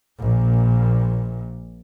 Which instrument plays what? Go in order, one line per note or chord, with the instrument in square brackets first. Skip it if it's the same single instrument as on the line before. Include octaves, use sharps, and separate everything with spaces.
[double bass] A#1 A#2